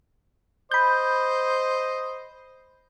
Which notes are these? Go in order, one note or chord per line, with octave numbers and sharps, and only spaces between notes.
C5 D#5 B5 G6